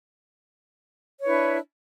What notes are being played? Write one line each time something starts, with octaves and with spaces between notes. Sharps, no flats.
D4 E4 B4 C#5